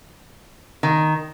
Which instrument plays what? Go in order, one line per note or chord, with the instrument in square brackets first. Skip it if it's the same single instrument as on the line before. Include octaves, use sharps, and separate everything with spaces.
[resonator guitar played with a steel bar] D#3